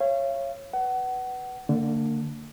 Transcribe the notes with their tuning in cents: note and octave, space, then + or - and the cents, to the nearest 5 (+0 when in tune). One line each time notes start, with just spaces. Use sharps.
C#5 -15 F5 -40
B4 +0 F#5 +25
D3 +0 A#3 -40